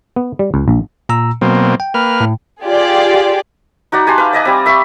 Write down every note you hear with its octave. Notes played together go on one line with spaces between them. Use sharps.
B3
G3
C#2
A#1
A#2 A#5 E6
B2 F#3 A#3 C4
G5
A#3 B4 F6
A2
F4 G4 G#4 D5
D#4 F#4 D5 B5
G4 G#5 A5 C6
B4 F5
D5 D#5 G#5 A#5
G3 C4
E5 B5 C#6